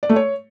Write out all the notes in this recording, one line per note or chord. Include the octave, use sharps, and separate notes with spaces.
D5
A3
C#5